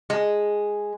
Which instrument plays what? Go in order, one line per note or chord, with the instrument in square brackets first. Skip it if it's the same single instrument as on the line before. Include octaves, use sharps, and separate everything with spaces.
[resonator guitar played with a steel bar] G#3